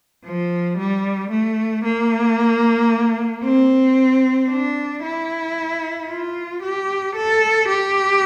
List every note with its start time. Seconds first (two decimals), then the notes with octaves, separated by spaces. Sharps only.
0.25 F3
0.78 G3
1.30 A3
1.84 A#3
3.44 C4
4.49 D4
5.03 E4
6.09 F4
6.63 G4
7.16 A4
7.68 G4